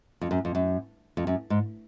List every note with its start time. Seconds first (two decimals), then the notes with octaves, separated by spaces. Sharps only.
0.21 F2
0.31 F#2
0.45 F2
0.55 F#2
1.17 F2
1.27 F#2
1.50 G#2